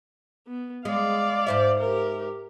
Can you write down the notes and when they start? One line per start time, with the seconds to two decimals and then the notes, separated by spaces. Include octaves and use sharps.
0.47 B3
0.85 G#3 D5 F5
1.47 G#2 C5 E5
1.79 G4 A#4